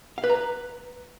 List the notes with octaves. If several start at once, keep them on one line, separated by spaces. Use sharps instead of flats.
F5
B4
A#5
B4